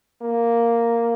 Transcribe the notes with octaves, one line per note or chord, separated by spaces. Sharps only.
A#3